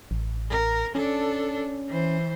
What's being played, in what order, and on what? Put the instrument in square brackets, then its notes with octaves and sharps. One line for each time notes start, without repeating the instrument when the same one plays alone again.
[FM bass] A1
[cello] A#4
[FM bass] C#4 [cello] D4 A4
[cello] E3 C5